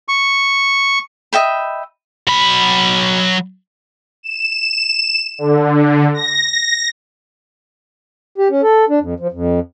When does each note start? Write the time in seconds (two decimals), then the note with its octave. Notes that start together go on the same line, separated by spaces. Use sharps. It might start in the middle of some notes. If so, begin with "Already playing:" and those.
0.08 C#6
1.33 D#5 E5 G5 B5
2.27 F#3 B5
4.23 E7
5.38 D3
6.14 A#6
8.38 G4
8.50 C#4
8.62 A4
8.89 D4
9.00 F2
9.20 F3
9.32 F2